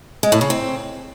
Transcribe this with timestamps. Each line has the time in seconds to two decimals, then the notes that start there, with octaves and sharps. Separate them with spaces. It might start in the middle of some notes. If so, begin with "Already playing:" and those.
0.23 G#3
0.32 A2
0.41 C#3
0.50 C4